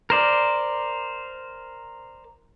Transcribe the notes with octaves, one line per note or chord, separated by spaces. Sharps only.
A#4 C5 D5